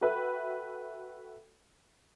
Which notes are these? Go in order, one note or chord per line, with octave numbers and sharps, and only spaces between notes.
F#4 A4 B4 E5 G5